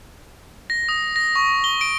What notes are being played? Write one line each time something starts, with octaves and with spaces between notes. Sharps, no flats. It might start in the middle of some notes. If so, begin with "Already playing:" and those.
A#6
D#6
A#6
C#6
G7
D7